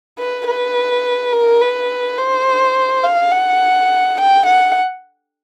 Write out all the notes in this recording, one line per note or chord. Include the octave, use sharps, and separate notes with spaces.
B4
B4
A#4
B4
C5
F5
F#5
G5
F#5